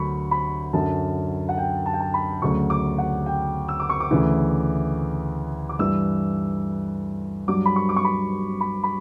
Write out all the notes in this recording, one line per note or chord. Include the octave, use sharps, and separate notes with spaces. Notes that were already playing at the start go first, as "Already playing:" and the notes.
Already playing: D2 D3 F#3 B5 C#6
B5
F#2 D3 F#3 A5
F#5
G5
A5
G5
A5
B5
D2 C#3 F#3 C#6
D6
F#5
G5
E6
D6
C#6
D6
D2 C#3 E3
D6
G2 E3 E6
G2 F#3 D6
B5
C#6
D6
C#6
B5
B5
B5